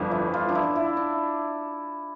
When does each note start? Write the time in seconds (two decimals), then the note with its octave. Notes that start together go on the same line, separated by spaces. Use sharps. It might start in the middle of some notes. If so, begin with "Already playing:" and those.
Already playing: G1 F2 E3 D4
0.11 E4
0.34 F4
0.49 D4
0.55 E4
0.76 E4
0.97 D4